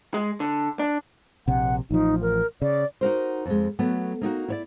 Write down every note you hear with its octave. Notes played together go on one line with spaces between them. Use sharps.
G#3
D3
D4
A#1 C3 F#5
A1 F3 D#4
A#4
C#3 D5
D#4 F#4 A#4 C5
F2 G#3
F#3 A3 B3
A#3 D#4 F4 F#4
E4 C#5 D5